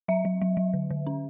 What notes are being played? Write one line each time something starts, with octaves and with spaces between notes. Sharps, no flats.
F#3 E5
F#3
F#3
F#3
D3
D3
C#4